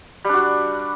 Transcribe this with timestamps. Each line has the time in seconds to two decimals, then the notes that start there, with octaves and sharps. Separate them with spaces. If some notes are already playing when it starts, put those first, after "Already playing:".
0.25 G3
0.29 D4
0.33 F#4